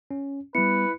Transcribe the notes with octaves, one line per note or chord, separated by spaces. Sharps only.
C#4
G3 B3 E4 B4 C#7